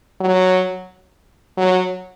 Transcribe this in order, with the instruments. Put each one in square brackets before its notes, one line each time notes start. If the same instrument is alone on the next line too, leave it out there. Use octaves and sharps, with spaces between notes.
[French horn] F#3
F#3